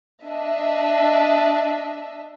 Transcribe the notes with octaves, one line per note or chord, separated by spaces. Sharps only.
D4 D#5 E5